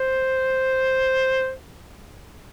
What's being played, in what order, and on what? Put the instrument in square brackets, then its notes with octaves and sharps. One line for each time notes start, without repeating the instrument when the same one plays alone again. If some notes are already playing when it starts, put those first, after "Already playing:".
Already playing: [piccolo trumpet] C5